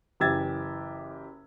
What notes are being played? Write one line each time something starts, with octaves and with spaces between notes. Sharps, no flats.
F#1 E3 G4 E6 G#6 A6